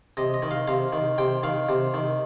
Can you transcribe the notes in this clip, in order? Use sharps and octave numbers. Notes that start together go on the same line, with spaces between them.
C3 D#5
D#5
D#3
F5
C3 F5
D#3
C3 G5
D#3 F5
C3
D#3